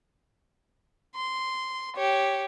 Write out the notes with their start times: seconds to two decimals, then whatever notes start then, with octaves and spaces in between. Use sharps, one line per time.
1.15 C6
1.96 G4 C#5